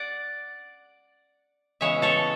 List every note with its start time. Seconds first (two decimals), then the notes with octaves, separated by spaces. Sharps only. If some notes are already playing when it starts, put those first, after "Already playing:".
Already playing: D5 F#5
1.81 C#3 E3 G#3 B3 C#5 E5
2.02 A4 C#5